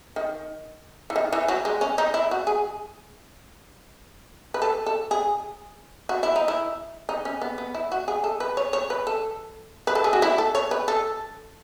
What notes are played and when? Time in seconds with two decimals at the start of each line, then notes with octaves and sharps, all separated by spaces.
0.16 D#3
1.10 E3
1.16 D#3
1.33 E3
1.48 F#3
1.65 G#3
1.81 C#4
1.98 D#4
2.14 E4
2.31 F#4
2.47 G#4
4.54 B4
4.62 A4
4.86 A4
5.11 G#4
6.09 F#4
6.23 E4
6.36 D#4
6.48 E4
7.09 D#4
7.25 C#4
7.41 B3
7.58 B3
7.74 E4
7.92 F#4
8.08 G#4
8.24 A4
8.40 B4
8.57 C#5
8.73 C#5
8.90 B4
9.07 A4
9.87 B4
9.95 A4
10.04 G#4
10.13 F#4
10.22 E4
10.38 A4
10.55 C#5
10.71 B4
10.88 A4